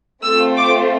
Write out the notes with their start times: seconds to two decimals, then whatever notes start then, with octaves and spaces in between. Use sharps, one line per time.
0.23 A3 C4 F4 E6
0.56 D6